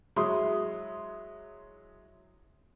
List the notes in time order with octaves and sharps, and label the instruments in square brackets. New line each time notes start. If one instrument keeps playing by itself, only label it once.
[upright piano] F#3 G#3 E4 C6 D#6